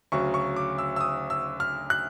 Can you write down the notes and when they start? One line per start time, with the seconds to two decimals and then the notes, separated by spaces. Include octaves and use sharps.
0.12 D2 C#3 F#3 C#6
0.34 C#6
0.56 D6
0.78 E6
0.96 E6
1.01 D#6
1.30 E6
1.60 F6
1.90 F#6